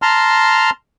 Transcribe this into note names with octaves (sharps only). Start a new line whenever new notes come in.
A5 A#5 C6 F6